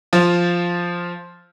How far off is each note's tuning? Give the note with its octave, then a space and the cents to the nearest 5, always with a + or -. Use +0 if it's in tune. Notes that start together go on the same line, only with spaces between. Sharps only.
F3 +0 F4 +0